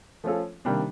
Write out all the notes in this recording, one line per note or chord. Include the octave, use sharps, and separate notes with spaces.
F3 A3 C#4 F4 A4
C3 D#3 G3 A#3 D4